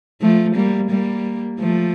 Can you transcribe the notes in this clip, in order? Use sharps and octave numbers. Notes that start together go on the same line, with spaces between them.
F3 A3
G3 A#3
G3 A#3
F3 A3